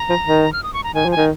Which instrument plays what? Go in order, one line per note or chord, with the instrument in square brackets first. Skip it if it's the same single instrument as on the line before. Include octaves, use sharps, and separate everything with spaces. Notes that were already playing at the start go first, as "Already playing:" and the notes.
Already playing: [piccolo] A#5
[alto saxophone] F3
D#3
[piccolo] F6
D#6
C#6
A#5
[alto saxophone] D#3 [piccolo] G#5
[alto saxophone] F3
[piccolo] G#5
[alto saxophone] D#3